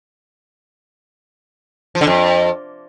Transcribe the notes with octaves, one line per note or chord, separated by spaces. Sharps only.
F3
D3
F2